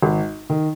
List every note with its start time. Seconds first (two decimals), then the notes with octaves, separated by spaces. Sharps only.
0.03 G#1
0.50 D#3